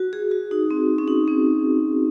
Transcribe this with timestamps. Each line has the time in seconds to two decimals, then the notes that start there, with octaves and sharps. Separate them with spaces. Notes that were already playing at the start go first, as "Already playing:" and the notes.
Already playing: F#4
0.13 G#4
0.31 F#4
0.51 D#4
0.71 C4
0.98 C#4
1.08 D#4
1.28 C4